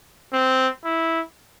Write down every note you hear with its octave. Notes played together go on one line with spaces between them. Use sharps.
C4
E4